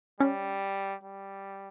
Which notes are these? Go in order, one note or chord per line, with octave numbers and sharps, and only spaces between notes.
G3 C#4
G3